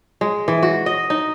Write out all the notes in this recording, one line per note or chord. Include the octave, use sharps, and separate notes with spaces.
G#3
E3
F#4
D#5
D#4